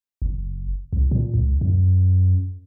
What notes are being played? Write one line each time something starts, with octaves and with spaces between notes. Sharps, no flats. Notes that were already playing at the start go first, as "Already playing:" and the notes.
F#1
C2
A#2
C#2
F#2